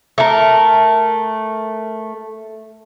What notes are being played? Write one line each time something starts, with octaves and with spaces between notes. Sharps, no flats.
A3 A#4